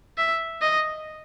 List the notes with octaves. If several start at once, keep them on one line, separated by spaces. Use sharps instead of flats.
E5
D#5